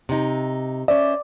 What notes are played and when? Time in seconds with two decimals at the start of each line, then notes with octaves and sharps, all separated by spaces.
0.09 C3 D#4
0.88 C#4 C5 D5 E5